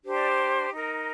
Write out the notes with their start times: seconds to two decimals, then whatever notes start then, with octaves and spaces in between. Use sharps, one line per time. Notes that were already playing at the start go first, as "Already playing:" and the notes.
0.03 D4 G4 C5
0.14 D5
0.70 D#4 A#4